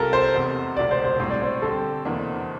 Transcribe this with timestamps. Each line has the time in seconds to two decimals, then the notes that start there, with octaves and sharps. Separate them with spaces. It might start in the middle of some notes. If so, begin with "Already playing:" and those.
Already playing: C2 C3 G3 C4 F4 A4 A#4
0.13 C5
0.34 F1 E2 C3
0.77 E1 D2 C3 D5
0.91 C5
1.05 C5
1.19 A2 G3 C4 G4 C5
1.30 D5
1.42 C5
1.62 D3 G3 C4 G4 A4
2.05 F1 E2 E3 A#3 D4